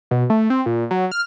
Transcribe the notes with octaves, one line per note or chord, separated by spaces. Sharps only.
B2
A3
C4
A#2
F#3
F6